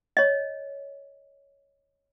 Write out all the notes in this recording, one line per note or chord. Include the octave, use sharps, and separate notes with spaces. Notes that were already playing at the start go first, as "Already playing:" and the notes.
C#5 D#5